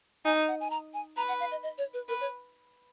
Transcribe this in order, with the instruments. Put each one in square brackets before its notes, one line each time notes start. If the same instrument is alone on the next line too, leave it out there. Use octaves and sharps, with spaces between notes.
[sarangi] D#4 [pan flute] G#5
[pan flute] F#5
G#5
A#5
G#5
[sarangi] B4 [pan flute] A#5
[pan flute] F#5
F5
D#5
D#5
C#5
B4
[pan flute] A#4 [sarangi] B4
[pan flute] C#5